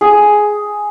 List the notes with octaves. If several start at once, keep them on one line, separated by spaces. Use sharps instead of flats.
G#4